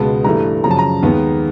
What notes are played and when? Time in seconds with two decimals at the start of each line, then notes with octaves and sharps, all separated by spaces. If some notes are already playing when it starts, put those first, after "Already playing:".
Already playing: C#2 B2 G#3 B3 A5
0.24 G2 E3 A3 A#5
0.64 F#2 C#3 F3 A#5
0.71 A5
0.79 A#5
1.03 D#2 D#3 G#3 B3